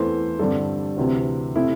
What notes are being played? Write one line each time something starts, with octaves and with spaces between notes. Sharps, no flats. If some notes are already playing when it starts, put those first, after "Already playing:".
Already playing: E2 E3 A3 C4 C5
G2 D3 G3 C4 A4
D2 C3 E3 C4
C3 A3 C4 E4